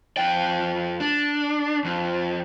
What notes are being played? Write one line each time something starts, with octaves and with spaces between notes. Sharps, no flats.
F2 G5
D4
F2